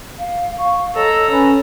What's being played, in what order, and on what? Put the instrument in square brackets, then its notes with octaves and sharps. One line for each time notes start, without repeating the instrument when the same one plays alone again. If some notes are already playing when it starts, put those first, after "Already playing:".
[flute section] F5
F5 C#6
[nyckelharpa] A4 A#5 [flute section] C#5 D#5 E6
[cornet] C#4 [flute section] B4 G#5 B5